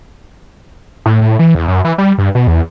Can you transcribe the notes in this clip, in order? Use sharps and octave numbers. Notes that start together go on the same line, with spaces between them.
A2
A2
E3
E2
F#2
E3
G3
G2
B2
E2